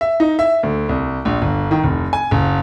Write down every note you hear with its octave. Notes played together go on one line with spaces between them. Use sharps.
E5
D#4
E5
D2
C2
A#1
G1
D#3
F1
G#5
F#1